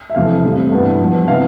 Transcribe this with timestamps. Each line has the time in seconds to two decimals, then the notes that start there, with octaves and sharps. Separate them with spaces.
0.10 E5
0.15 F2 C3 E3 F5
0.43 A2 G3 C4
0.72 G2 E3 B3
1.00 G2 F3 B3
1.27 C3 E3 B3 F5